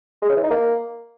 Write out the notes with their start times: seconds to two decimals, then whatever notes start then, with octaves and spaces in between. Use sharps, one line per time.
0.22 G#3
0.29 C#3
0.36 E3
0.44 D#4
0.51 A#3